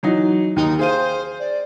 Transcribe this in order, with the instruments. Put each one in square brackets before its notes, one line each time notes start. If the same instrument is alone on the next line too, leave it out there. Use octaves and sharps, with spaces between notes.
[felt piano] E3 F#3 D#4
[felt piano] D#2 [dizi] D#4
[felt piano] G#4 F5 D#7 [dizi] C5
[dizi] D5